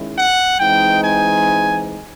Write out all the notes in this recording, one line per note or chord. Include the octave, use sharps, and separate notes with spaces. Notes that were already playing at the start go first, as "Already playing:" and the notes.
Already playing: D#3 G#3 C#4 E4
F#5
E3 G#3 C4 D#4 G5
G#5